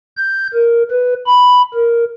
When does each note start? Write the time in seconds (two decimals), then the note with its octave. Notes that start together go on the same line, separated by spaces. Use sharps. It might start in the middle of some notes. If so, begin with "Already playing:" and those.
0.17 G6
0.54 A#4
0.91 B4
1.27 B5
1.74 A#4